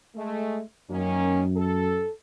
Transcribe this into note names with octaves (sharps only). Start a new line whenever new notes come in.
G#3 A3
F#2 D#3 A#3 C#4
A4